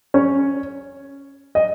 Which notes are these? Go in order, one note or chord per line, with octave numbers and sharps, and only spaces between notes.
C#4 C#5
D#5